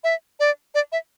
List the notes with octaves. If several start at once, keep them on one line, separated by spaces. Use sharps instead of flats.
E5
D5
D5
E5